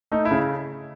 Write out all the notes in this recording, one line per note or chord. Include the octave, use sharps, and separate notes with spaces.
A3 D#4
E4
C#3